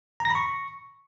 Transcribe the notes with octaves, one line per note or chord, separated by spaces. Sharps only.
A#5
A#6
B5
C#6